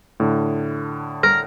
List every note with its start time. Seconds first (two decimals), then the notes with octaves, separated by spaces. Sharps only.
0.20 A2 D3
1.23 A#4